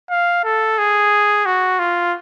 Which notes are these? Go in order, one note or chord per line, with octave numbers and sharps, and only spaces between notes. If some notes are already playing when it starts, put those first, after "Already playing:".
F5
A4
G#4
F#4
F4